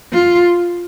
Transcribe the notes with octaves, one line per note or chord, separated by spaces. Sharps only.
F4